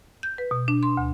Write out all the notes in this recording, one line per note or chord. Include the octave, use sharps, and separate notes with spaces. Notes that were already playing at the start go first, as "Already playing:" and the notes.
G6
B4
B2
D4
C6
D2